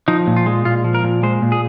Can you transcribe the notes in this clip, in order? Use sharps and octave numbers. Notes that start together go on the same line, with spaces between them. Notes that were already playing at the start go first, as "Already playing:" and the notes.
F3 D#4
A#2
F4
G#3
A#2 F4
F3
A#4
A#2
G#3 C5
A#2
G#4